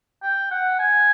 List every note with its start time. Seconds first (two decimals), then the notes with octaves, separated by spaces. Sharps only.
0.23 G5
0.51 F#5
0.79 G#5